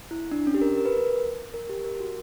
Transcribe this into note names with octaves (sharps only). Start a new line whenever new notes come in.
E4
D4
C#4
G4
A#4
A#4
B4
A#4
A#4
G4
A#4
F#4